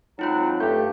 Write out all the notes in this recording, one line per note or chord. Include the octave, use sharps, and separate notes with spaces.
G#2 F#3 C4 D#4 F4 A#5 F#6
G2 A3 G4 F5 G6